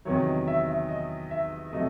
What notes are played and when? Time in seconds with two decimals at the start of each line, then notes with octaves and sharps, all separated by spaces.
0.05 E2 C3 D#3 F#3 C#5
0.26 D#5
0.47 E5
0.68 E5
0.89 D#5
1.31 E5
1.73 C3 F#3 A3 D#5